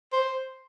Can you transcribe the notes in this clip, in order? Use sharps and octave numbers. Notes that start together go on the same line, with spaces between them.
C5